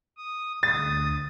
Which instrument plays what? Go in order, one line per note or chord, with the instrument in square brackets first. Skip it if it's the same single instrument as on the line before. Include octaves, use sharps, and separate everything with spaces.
[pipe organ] D#6
[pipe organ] D2 D#6 [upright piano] A6